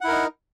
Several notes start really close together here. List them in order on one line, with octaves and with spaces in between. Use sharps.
F#5 E4 A#4 D#4